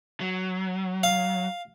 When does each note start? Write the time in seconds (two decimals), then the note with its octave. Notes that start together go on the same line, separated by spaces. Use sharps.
0.20 F#3
1.03 F5